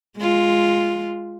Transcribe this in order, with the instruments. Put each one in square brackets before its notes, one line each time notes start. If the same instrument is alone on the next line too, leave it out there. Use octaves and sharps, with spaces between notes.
[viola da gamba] G#3 F4